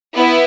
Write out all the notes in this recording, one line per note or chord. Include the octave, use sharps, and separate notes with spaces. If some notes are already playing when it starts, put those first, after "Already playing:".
B3 E4